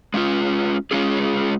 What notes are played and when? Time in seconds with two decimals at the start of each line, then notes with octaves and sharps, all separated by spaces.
0.14 G#3 C#4 F4
0.91 G#3 C#4 F4 G#4